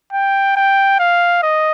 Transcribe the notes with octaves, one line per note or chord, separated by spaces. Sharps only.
G5
G5
F5
D#5